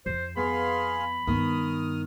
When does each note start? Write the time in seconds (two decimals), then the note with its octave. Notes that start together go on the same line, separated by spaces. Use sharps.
0.06 F2 C5
0.37 B3 G#4 F5 B5 C6
1.27 G2 D#3 B3 D#6 F6